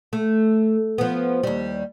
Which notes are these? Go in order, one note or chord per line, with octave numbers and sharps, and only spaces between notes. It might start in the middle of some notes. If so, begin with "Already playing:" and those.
A3
F3 B3
D#2 G3